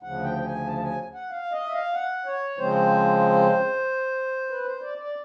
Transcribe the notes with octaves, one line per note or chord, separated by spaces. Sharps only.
D2 C#3 F3 F#5
G5
G5
G#5
A5
A5
G#5
F#5
F5
D#5
E5
F5
F#5
C#5
C#3 F3 G#3 C4 C5
B4
C5
D5
D5